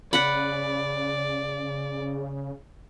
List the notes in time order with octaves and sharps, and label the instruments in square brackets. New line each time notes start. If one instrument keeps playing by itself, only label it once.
[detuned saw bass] C#3 [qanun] B4 F#5 B5 [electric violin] D5